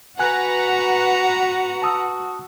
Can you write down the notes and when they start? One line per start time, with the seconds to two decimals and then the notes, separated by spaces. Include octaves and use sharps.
0.19 F#4 B4 F#5 G#5 A#5 F#6
1.82 A5 D#6 E6